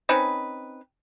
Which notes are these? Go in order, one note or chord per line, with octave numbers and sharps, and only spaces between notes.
C4 C#4 D#4 B4